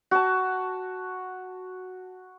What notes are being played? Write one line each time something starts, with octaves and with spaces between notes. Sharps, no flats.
F#4 A5